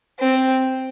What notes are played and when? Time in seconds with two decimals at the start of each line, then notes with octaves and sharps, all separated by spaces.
0.20 C4